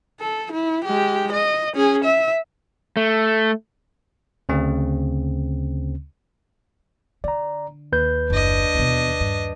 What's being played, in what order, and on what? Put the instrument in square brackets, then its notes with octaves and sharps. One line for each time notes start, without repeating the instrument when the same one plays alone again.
[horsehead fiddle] A4
E4
G#3 G4
D#5
C#4 G#4
E5
[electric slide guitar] A3
[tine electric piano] D2 C#3 C4
[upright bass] D3 [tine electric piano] D5 A#5
[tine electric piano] D#2 B4 G6
[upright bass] F#1 [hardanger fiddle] D4 D#5
[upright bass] E2 B2
G2